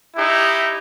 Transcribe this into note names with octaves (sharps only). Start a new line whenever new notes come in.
D#4 E4 G4